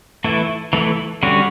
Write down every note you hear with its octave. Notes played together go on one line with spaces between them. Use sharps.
E3 A3 E4
E3 A3 E4
D3 G3 C#4 F#4